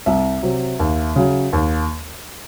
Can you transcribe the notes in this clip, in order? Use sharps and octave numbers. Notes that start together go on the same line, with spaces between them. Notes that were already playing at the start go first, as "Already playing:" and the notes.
C2 E5
C3 F#3
D#2
C#3 F#3
D#2